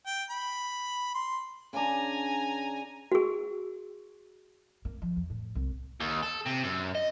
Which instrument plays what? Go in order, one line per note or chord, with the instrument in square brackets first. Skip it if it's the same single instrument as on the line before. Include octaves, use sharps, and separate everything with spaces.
[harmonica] G5
B5
C6
[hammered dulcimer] C#3 D4 [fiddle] G#5 A#5
[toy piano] F#4 G#4
[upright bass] A#3
F3
E2
A2
C2
[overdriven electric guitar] D#2
A4
C3
F#2
D#5